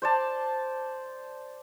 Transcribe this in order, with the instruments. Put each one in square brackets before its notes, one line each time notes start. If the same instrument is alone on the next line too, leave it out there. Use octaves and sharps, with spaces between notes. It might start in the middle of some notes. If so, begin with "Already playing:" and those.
[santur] C5 D5 A5